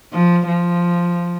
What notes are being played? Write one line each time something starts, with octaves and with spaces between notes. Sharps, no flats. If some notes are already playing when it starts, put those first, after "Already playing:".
F3
F3